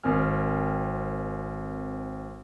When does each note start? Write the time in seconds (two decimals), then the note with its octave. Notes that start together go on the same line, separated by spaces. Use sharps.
0.03 G#1 C4 A#4 G#5 F6